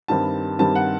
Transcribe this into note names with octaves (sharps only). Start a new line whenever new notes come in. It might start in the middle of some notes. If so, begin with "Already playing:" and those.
G2 D#3 G3 C4 A5
G2 D#3 G3 C4 A5
F#5